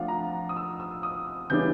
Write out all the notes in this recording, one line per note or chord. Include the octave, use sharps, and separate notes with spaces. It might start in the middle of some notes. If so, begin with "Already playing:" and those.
Already playing: F3 A3 D4 F4 F5 F#5
A#5
D#6
E6
E6
D#6
C#3 E3 G3 B3 D4 G6